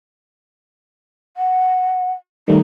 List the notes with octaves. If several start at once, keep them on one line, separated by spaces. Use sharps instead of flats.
F#5
D#3 G3 A3 D#4